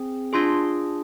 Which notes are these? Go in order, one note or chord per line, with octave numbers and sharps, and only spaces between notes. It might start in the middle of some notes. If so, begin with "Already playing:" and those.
Already playing: C4 G#4
D4 F4 G#4 C6